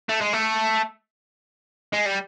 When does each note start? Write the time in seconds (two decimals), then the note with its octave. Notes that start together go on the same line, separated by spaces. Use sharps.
0.09 A3
0.21 G#3
0.33 A3
1.93 G#3
2.06 G3